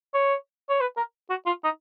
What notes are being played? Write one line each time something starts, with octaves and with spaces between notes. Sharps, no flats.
C#5
C#5
B4
A#4
F#4
F4
D#4